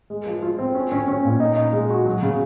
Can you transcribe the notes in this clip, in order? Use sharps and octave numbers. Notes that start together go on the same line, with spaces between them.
G#3
F3
F4
C4
C#4
C#4
C#4
A#2
D#4
D#4
G#3
F#4
F#3
C#3